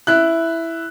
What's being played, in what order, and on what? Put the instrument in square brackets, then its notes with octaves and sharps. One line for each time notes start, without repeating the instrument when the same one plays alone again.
[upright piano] E4 F#6